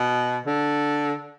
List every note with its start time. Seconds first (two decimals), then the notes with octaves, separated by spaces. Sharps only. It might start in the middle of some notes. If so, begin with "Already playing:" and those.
Already playing: B2
0.46 D3